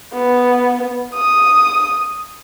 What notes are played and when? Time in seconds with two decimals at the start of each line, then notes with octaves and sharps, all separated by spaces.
0.14 B3
1.14 D#6